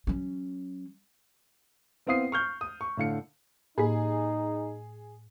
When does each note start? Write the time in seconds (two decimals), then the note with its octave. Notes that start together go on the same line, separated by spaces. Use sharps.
0.07 F#3 C#4
2.07 B3 C4 E4 F5 D#6 C7
2.32 C#6 F6 G6
2.61 D#6
2.81 C#6
2.97 A2 D3 F5 C#7
3.78 A2 A#3 D#4 G#4